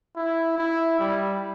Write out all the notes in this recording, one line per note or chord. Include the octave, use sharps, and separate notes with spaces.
E4
E4
G3